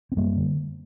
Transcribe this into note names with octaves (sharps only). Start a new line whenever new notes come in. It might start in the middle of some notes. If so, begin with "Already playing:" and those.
C4
F#2 G3 A#3
D3